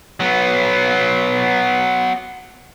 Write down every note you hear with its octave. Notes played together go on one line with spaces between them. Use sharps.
F#3 B3